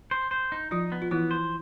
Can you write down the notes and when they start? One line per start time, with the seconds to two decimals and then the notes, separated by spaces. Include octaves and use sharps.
0.11 C5
0.31 C5
0.52 D#4
0.71 F3 D#4 F4
0.92 B3
1.02 F4
1.11 E3 B3 E4
1.31 C5